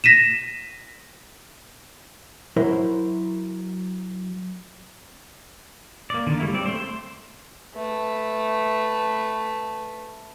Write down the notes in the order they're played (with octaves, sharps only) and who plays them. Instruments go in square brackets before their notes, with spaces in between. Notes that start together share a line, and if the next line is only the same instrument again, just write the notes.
[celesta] A#6 B6 D#7 E7
[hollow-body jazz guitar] F#3 E4 A#4 C5
[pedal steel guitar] A#3 D5
D3 D#3 A#3
G3 A3 A#3 E4
G3 C4 D5
A3 C5
C6
[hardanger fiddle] A3 B4